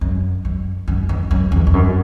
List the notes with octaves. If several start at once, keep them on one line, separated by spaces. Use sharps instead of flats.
F#2
F#2
F#2
E2
F#2
E2
E2
F#2